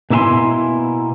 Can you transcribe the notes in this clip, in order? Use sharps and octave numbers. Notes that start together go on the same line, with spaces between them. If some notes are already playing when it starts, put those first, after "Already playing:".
B2 A#3 E4 E5 G#5 C6